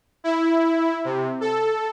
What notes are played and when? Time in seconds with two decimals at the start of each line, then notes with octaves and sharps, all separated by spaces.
0.24 E4
1.05 C3
1.41 A4